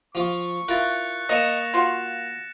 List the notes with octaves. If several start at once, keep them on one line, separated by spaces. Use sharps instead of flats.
F3 F4 C#6
E4 F4 A#4 F#6 A6
A#3 D#5 A#6 C#7 E7
F4 F#4